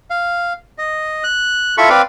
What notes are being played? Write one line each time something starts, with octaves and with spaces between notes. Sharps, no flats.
F5
D#5
F#6
E4 F4 A4 B5 C#6
C4 B4 D5 F5